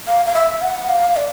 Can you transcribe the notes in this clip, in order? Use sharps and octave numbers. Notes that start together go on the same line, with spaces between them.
F5
F5
E5
F#5
F5
D5